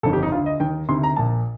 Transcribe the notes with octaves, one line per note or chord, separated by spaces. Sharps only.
G1 F2 D#3 A4
G4
D#4
D2 D3 F4
D#5
D#2 D#3 G5
D2 C3 D#3 C6
A#5
A#1 A#2 A5